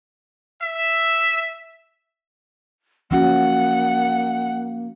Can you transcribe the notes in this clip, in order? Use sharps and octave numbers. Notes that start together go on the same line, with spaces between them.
E5
F3 A#3 C#4 F#4 F#5